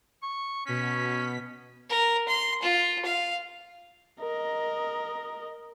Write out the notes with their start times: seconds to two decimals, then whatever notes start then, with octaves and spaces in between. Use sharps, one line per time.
0.23 C#6
0.66 B2 C#4 B6
1.90 A#4
2.28 C6
2.62 F4
3.05 F5
4.20 A#4 D#5